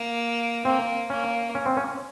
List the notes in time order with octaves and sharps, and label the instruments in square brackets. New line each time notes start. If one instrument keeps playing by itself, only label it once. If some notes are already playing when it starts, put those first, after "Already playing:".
Already playing: [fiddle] A#3
[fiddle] A#3 [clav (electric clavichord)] C4
[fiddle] A#3 [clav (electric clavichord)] C#4
[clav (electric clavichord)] C#4
C4
C#4